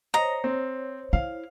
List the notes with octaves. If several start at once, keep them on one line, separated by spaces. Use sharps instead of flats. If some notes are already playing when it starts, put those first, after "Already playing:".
C5 C#5 D#5 A#5
C4
E4 F5